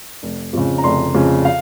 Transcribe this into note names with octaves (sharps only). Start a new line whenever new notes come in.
F1
F2 C#3
A#5
F1 C6
F2 C#3
F5